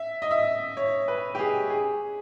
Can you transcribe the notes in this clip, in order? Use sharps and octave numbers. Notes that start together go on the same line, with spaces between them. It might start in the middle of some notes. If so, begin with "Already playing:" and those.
Already playing: E5
D#5
E5
C#5
B4
G4
G#4
G#4